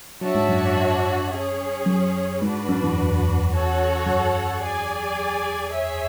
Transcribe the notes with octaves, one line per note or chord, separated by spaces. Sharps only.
F#3 D4 F#4 C#5 E5 A5
G#2
F#2
F#2
C#4 G#4 C#5
F#2
G#2 D4 F#4 B4
F#2
E2
C#4 F#4 A4 C#5 F#5
F#2
G#4 D5 G#5
G#4 C#5 E5 G#5